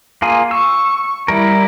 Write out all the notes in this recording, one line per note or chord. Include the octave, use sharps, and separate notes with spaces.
A#3 F4 G#4
C#6 E6
G3 E4 A#4